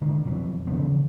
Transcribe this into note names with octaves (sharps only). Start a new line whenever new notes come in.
D3 D#3 G#3
B1 F2 E3 F#3
C#3 E3 F3 B3